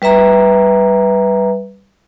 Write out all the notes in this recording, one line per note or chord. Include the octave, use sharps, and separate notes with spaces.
G3 B4 E5 A#5